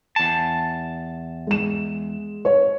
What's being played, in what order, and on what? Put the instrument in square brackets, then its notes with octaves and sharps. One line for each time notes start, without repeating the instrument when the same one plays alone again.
[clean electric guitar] E2 A5
[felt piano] G#3 E7
C#5